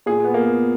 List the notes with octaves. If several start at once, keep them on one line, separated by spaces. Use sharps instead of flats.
A#2 G#4
B3
A#3